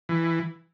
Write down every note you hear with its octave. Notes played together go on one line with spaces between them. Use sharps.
E3